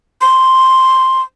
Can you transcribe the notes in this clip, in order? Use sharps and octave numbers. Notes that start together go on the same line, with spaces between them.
C6